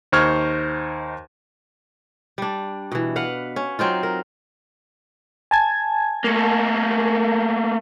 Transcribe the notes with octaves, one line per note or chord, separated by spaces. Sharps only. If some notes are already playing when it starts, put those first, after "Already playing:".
D#2 D#4 C5 C#6 F6 G#6
G3 D4
B2 E3
B4 F5 F#5
C#4
F#3 C4 D#4 F4
A#4
G#5 A5 G#6
A3 A#3